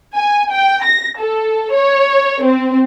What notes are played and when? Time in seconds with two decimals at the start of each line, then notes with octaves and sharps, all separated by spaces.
0.16 G#5
0.51 G5
0.85 A#6
1.19 A4
1.73 C#5
2.44 C4